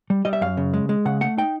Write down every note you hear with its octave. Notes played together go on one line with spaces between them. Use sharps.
G3
G3 D#5
E5
F#2 F5
C#3
G#3
G#3
C#3 F#5
A3 F#5
D#4 G5